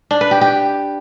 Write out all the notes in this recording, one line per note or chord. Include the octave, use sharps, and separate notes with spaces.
D4
B4
G4
G4